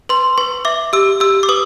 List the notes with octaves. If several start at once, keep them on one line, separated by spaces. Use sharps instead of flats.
B4 C6
B4 C#6
E5 D6
G4 E6
G4 E6
D6
B4 D#6